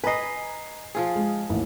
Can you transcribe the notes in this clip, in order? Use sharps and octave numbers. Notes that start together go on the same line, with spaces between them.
B4 D#5 G#5 A#5 C7
F3 F4 G#4
G#3
A1 D#2